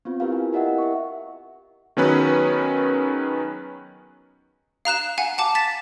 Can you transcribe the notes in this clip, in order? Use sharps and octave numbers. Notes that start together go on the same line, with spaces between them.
B3 C4 F4
E4 F4 G4 A#4 B4 F5
G#5
E4 G4 A#4 D#5 E5 F#5
E5 C#6
D#3 F#3 B3 C#4 G#4 B4
F5 A#5 F#6 E7
F5 F#5 G#5
F#5 A5 D6
A6 B6 E7